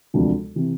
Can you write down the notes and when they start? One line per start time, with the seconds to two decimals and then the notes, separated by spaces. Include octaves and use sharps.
0.14 E1 D2 C3 F3
0.55 C3 E3